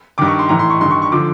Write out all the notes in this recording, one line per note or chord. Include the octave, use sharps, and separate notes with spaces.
G2 D#3 D6
C#6
C6
A2 E3 A#5
C6
C#6
G2 D#3 C6
C#6
C#6
D3 F3 D6